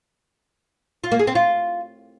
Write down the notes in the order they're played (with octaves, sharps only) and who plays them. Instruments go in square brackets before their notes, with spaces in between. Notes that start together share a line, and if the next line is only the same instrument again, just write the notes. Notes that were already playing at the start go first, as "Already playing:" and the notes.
[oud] F4
A#3
G#4
C4
F4